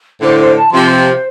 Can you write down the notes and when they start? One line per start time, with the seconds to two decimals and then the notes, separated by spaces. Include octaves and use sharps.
0.21 A2 D3 C5
0.38 C5
0.55 A5
0.73 C3 F3 C6
0.89 C5
1.07 C5